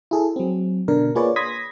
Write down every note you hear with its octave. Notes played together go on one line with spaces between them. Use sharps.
E4 G#4 A4
F#3 C4
B2 D3 D4 A#4
A#3 F4 G#4 B4 C#5 D5
B5 C6 D#6 G#6 A#6 B6